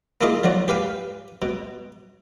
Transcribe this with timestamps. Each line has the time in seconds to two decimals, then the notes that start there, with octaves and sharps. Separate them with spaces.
0.21 A#3 E4 F4 G#4 D#5
0.44 D3 F3 F#3 F#4
0.68 G4 B4 F5 G#5
1.42 B2